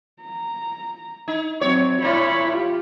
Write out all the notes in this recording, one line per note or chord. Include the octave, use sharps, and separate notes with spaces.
A#5
D#4
F#3 C4 C#5
A#2 E4 C#5 B5
F4 G4